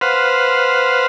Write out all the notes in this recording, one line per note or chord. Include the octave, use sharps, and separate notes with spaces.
B4 C5 F5 F#5